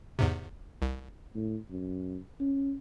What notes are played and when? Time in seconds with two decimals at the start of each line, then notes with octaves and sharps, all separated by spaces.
0.19 E2 G#2 C3
0.82 C2
1.35 A2
1.71 F#2
2.40 C#4